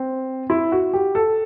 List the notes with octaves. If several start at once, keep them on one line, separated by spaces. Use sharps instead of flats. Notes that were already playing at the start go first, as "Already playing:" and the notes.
Already playing: C4
E4
F#4
G4
A4